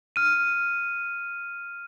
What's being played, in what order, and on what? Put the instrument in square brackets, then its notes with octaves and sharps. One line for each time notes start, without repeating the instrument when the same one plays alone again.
[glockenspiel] F6 D#7